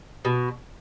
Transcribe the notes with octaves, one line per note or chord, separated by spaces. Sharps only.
B2